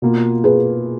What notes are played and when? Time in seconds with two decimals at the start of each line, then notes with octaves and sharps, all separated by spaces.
0.02 B2 A#3 F4
0.44 G#4 B4